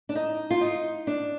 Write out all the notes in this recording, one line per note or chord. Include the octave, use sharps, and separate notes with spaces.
D4
D#4
F4
D#4
D4